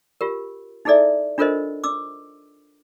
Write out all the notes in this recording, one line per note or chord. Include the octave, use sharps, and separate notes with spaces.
F4 G4 A#4
D#4 E4 G#4 A4 D5 E5
D4 F4 A4 A#4 C5 D#5
D6 E6